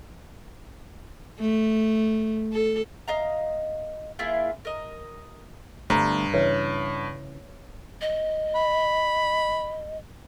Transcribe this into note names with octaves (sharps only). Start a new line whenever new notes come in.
A3
A4
D#5 F5 A#5
A#3 E4 F4 G#4
A#4 D#5
G1 E2 G2 A3 C5 A#5
C#3 E3 B4 C#5 E5
D#5
B5